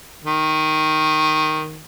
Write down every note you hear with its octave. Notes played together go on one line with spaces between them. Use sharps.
D#3